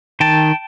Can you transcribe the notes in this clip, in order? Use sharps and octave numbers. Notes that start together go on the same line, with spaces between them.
D#3 G5 A5